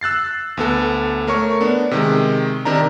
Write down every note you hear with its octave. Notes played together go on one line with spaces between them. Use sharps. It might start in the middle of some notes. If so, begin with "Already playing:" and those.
E6 F#6 A6 C7
D2 B3 A4
A3 A#4 C#5 C#6
B3 D4
C3 D#3 G#3
C3 D#3 D4 A#5